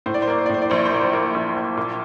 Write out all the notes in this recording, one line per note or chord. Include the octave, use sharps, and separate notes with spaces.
A2 C5
D5
C5
A#3 D5
C5
D5
A2 C5
D5
A#1 C5
D5
C5
A#3 D5
C5
A#3
A#1
A#1
A#2